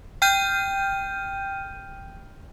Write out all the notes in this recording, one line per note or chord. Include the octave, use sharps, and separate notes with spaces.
G5 F6 G6 D#7